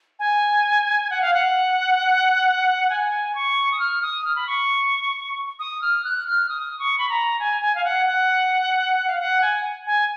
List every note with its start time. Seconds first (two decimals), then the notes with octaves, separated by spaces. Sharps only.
0.19 G#5
1.10 F#5
1.21 F5
1.34 F#5
2.90 G#5
3.35 C#6
3.72 D#6
3.79 F6
4.02 D#6
4.25 F6
4.36 B5
4.47 C#6
5.59 D#6
5.82 F6
6.04 F#6
6.27 F6
6.49 D#6
6.79 C#6
6.98 B5
7.09 A#5
7.39 G#5
7.61 G#5
7.75 F5
7.84 F#5
8.06 F#5
9.07 F5
9.19 F#5
9.41 G#5
9.86 G#5